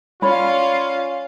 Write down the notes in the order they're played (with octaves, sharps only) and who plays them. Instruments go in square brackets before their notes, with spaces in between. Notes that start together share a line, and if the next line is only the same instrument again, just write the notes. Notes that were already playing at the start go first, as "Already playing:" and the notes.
[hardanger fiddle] C#4 F5 [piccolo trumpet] F4 [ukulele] C#5 D5 B5